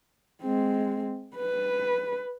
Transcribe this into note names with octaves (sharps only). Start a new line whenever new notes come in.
G#3 C4
B4